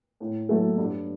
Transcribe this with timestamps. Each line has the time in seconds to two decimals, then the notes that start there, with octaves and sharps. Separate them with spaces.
0.20 A2
0.49 F#3 A3 E4 A4
0.78 G2